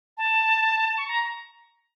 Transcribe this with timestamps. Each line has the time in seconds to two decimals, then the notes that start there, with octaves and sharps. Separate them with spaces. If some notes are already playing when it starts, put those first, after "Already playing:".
0.18 A5
0.97 C#6
1.08 A#5